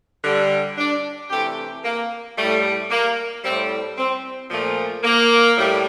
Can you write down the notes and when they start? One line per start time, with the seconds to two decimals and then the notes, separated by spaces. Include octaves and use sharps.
0.24 D3 G3
0.78 D4
1.30 C3 E3 A3 G4
1.85 A#3
2.37 A2 G3 A3
2.90 A#3
3.44 A2 G3 C4
3.98 C4
4.50 A#2 F3 A3
5.04 A#3
5.57 A2 G3